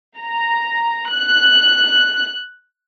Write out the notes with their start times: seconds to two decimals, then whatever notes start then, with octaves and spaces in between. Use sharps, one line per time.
0.18 A#5
1.13 F#6